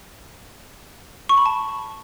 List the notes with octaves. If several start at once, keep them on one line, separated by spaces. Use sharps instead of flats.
C#6
B5
A5